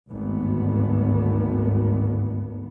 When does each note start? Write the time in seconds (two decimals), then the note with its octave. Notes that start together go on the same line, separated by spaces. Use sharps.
0.11 G#1 D2 G2 B3